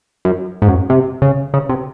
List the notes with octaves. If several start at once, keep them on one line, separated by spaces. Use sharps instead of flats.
F#2
G#2
F#2
C3
C#3
C#3
C3